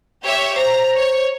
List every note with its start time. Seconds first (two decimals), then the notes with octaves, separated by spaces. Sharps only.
0.23 G4 C#5 E5
0.56 C5 A#5
0.96 C#5